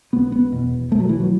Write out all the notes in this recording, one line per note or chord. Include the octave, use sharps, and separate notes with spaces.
B1 B2 B3
B3
E1 E2 B2
B1 B2 A3
F#3
E3
F#3